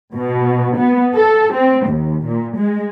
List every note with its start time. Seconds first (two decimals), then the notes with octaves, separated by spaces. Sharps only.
0.14 B2
0.77 B3
1.14 A4
1.52 C4
1.86 D#2
2.25 A#2
2.56 G#3